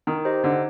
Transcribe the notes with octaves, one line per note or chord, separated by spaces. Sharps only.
D#3 D#4
G4 C5 D#5
D3 D#4